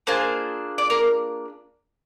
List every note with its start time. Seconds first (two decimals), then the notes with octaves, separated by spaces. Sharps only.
0.07 A#3 D4 F4 G#4 C5
0.78 D5
0.90 A#4